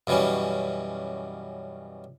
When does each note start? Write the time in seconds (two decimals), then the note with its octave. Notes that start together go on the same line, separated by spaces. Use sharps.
0.07 F#2 B2 E3 G3 C#4